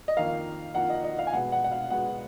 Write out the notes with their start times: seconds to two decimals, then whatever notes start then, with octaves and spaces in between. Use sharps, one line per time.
0.08 D#5
0.17 F2 D#3 A#3 F5
0.75 F2 D#3 A#3 F#5
0.89 D#5
1.04 D#5
1.19 F5
1.27 G#5
1.33 B2 G#3 B3 F#5
1.52 F#5
1.64 F#5
1.72 F5
1.90 B2 G#3 B3 F#5